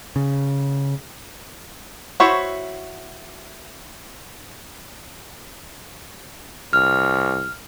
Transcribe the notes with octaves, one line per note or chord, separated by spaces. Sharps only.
C#3
E4 F#4 C5 C#5 E5
C2 F6